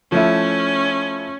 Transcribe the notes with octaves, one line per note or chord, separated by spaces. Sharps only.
F3 A3 C#4 E4